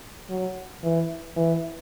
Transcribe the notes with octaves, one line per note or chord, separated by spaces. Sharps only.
F#3
E3
E3